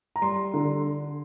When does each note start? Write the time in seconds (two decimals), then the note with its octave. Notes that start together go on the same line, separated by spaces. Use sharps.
0.16 A#5
0.22 G3 C6
0.54 D3